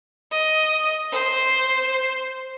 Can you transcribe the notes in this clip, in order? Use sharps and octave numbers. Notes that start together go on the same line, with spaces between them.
D#5
C5